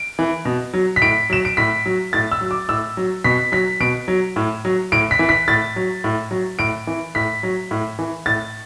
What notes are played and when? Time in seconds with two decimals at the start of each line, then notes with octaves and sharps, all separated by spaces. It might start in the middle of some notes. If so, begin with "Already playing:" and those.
Already playing: D7
0.19 E3
0.45 B2
0.74 F#3
0.96 B6
1.02 A2 D7
1.30 F#3 E7
1.45 D7
1.57 A2 B6
1.86 F#3
2.13 A2 A6
2.31 E6
2.41 F#3
2.51 D6
2.69 A2 E6
2.97 F#3
3.24 B2 B6
3.52 F#3 B6
3.80 B2 D7
4.08 F#3
4.36 A2
4.65 F#3
4.92 A2 D7
5.11 B6
5.19 E3
5.29 B6
5.48 A2 A6
5.76 F#3
6.04 A2
6.31 F#3
6.59 A2 D7
6.87 E3
7.15 A2 B6
7.43 F#3
7.71 A2
7.99 E3
8.26 A2 A6